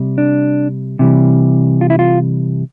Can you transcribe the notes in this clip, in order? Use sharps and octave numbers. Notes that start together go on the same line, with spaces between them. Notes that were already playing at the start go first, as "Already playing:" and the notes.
Already playing: C3 G3
D4
C3 E3 G3
F4
E4
F4